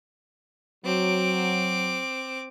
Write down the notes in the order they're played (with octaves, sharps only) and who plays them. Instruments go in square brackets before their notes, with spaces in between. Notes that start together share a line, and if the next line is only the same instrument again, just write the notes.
[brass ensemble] F#3 [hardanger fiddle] C4 D6